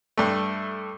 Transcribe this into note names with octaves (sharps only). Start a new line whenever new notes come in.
G2 A3